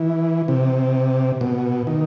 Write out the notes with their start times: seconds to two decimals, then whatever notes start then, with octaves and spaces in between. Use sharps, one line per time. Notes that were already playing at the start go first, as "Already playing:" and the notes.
Already playing: E3
0.48 C3
1.41 B2
1.87 D#3